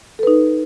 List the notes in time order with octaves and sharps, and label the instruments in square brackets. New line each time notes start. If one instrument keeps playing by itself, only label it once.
[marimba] A4
B4
D#4